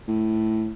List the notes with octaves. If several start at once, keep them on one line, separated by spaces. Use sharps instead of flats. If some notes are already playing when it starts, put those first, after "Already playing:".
A2